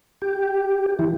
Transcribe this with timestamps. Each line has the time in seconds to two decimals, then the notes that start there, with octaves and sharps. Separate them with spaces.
0.22 G4
0.99 E3